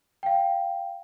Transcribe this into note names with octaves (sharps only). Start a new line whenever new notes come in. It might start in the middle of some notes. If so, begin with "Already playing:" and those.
F5 G5